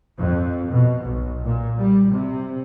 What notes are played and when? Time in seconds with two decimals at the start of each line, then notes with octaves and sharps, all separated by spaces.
0.18 F2
0.71 B2
1.05 B1
1.45 A#2
1.78 G3
2.12 C3